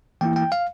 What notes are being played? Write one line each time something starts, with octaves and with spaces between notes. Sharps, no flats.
E3 A#3 E4 G5
G5
F5